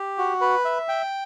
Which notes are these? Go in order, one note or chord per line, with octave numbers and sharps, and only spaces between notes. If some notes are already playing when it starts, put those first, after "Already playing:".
Already playing: G4
F#4
B4
E5
G5